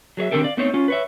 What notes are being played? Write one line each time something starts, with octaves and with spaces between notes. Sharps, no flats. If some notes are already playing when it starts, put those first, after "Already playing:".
F#3 G#4 C#5 E5
D#3 C4 D4 G4 A4 A#4
D5 F5
A3 B3 C4 D#4 C5 C#5
C#4 F4
B4 C#5 E5